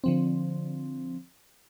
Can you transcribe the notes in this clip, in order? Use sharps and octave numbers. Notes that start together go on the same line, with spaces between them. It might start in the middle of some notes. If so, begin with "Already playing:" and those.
D3 F3 C4